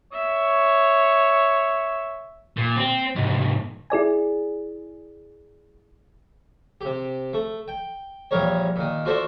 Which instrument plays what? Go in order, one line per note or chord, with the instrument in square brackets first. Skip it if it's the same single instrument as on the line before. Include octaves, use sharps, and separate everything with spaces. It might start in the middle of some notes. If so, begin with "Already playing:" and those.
[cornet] C#5 [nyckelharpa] E5
[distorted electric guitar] A#2
C4
C2 G#2
[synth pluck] E4 G#4 D5 G#5
[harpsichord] C3 G4
A3
G5
A#1 E2 G3 A#4 C#5
A#2 D#3
F4 F#4 A4 C5 D5 E5